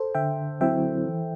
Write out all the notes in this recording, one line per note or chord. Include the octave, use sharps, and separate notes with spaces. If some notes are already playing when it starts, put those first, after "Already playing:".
Already playing: A4 C5
D3 E5 G5
F#3 C4 E4 E5 G5
E3